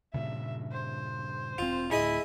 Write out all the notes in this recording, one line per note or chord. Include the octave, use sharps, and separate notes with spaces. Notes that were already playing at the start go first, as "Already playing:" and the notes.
G2 A#2 C#3 E5
C5
E1 C4 F4
D2 A2 E4 G#4 D#5 E5 D#6